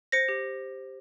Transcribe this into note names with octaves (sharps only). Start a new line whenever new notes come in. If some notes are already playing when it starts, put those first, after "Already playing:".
C5 A#6 C#7
G4